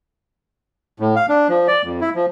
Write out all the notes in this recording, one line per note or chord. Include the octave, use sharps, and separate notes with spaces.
A2
F5
D4
F3
D5
F2
E4
F3